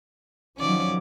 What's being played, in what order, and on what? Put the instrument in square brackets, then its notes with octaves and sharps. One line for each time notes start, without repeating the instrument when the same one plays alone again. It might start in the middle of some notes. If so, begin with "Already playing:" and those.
[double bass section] D#3 F3 F#3 [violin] C#4 D5